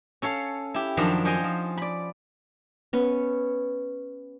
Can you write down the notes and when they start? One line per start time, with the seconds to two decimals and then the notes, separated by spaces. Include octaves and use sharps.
0.22 C#4 A4 C#5 F5
0.74 E4 G4
0.97 F#2 D#3 F3 D4 A#5
1.25 C#4 F4 C5 D#5 G5 G#5
1.44 F3
1.77 D5 B5
2.93 B3 C#4